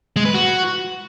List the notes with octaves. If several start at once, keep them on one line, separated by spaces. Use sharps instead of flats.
G#3
B4
F#4